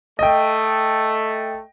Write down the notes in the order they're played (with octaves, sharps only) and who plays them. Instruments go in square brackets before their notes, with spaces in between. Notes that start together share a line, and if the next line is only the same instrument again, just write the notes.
[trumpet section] A3 [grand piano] D#5 G5